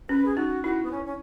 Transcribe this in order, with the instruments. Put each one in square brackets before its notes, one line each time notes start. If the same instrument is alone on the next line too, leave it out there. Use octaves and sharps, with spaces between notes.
[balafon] C#4 [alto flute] B4
[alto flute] G#4
[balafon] D#4 [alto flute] F#4
[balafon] E4 [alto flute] F#4
[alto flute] B3
C#4
C#4